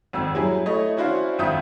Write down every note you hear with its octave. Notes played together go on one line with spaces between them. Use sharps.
G#1 F2 E6
F#3 G3 E4 G#4
A3 E4 C#5 D#5
C#4 D4 E4 F#4 C5 F5
G#1 F2 F4 E5 D#6 G6